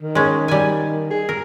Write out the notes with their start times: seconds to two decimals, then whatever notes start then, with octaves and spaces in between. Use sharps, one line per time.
0.01 D#3
0.15 G#3 C#4
0.48 G3 G#5
1.10 G#4
1.29 A#4